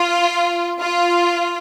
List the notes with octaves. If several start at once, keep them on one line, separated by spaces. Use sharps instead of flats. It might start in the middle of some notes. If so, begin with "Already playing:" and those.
Already playing: F4
F4